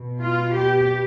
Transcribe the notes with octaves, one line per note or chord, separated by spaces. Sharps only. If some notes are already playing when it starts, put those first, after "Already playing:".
Already playing: B2
F4
G4